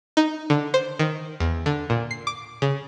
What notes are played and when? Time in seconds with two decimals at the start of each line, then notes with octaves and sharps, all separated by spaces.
0.17 D#4
0.50 D3
0.74 C5
1.00 D#3
1.40 E2
1.66 D3
1.90 A#2
2.11 C7
2.27 D6
2.62 C#3